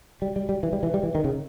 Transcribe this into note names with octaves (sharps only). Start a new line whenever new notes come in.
G3
G3
G3
E3
G3
E3
G3
E3
D#3
C#3